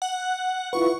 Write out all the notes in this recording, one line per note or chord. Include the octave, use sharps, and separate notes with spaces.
F#5
E4 F4 B4 C#6